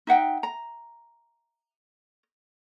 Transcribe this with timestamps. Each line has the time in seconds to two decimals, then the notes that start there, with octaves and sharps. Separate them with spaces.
0.07 D#4 E5 F#5 G5
0.43 A#5